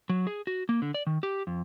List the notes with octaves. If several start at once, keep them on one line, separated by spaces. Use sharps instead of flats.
F#3
G#4
F#4
A#3
D3
D5
D#3
G4
F2